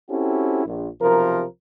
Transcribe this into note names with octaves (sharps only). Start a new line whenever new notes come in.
C4 C#4 E4 F#4 G4 A4
A#1
B1 C3 F3 A#4